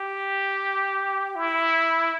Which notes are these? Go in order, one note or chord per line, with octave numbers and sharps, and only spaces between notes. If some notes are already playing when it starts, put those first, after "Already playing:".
Already playing: G4
E4